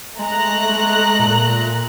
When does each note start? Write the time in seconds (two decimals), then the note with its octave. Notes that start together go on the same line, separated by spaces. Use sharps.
0.19 G#3 A3 A#5 F#6
0.69 G#3
1.19 A#2